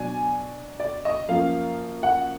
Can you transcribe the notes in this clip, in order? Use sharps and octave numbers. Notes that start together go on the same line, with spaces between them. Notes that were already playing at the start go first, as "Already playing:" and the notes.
Already playing: B2 F#3 D4 G#5
D5
D#5
F#2 F3 A#3 F5
F#5